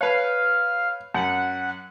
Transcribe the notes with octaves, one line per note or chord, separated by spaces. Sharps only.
B4 C#5 F5
F#2 F#5